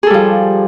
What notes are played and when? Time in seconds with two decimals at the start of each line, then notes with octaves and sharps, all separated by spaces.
0.03 G#4
0.07 A4
0.10 G3
0.14 F3